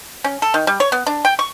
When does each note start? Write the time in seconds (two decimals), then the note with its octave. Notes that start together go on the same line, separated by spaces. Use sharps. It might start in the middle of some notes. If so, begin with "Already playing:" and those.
0.24 C#4
0.42 A4
0.54 D#3
0.67 G3
0.80 C#5
0.92 B3
1.07 D4
1.25 G5
1.39 C#6